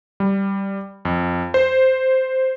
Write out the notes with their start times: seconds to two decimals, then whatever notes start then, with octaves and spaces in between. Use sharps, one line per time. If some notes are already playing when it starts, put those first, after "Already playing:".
0.20 G3
1.05 F2
1.54 C5